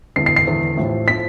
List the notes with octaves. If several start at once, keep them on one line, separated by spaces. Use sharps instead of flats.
E1 E2 D3 C7
C7
C7
E1 E2 D3
A1 A2 F3
A2 F3 B6